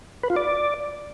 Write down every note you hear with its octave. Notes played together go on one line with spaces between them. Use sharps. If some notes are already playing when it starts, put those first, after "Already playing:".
B4
F4
D5